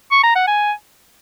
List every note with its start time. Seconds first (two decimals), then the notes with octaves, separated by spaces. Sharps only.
0.12 C#6
0.24 A#5
0.36 F#5
0.47 G#5